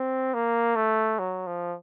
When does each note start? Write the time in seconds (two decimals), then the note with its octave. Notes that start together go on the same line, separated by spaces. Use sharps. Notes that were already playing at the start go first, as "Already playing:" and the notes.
Already playing: C4
0.34 A#3
0.76 A3
1.19 F#3
1.47 F3